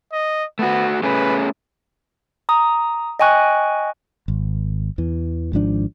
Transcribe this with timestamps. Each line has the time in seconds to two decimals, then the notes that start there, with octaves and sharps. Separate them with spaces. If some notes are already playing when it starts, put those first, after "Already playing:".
0.12 D#5
0.59 A3 B3 F#4
1.03 A3 C#4 G#4 B4
2.49 A#5 D#6
3.19 D#5 G5 G#5 C#6 F#6
4.28 G#1
4.98 E2 E3
5.53 G#1 G#2 F3 D4